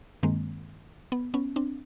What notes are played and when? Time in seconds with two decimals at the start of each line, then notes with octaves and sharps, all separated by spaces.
0.23 G2 D#3 G#3 A#3 C4
1.12 B3
1.34 B3 C#4
1.56 C4 D4